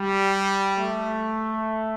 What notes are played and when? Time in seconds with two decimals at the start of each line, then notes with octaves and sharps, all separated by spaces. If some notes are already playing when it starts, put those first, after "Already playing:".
Already playing: G3
0.77 A3